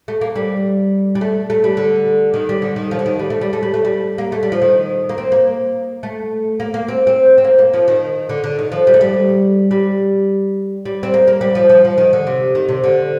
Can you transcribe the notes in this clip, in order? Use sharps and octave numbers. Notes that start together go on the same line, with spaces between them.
A3
A#3
G3
G3
A3
A3
G3
D3
D#3
G3
D3
D#3
F3
D3
D#3
G3
A3
G3
A3
G3
A3
G3
A#3
A3
G3
F3
D#3
A#3
C4
A#3
A3
A#3
A#3
C4
C4
C4
A#3
A#3
F3
D#3
D3
D3
D#3
F3
G3
A3
G3
G3
G3
C4
A#3
A#3
G3
F3
F3
F3
D#3
D3
C3
D#3
C3
D3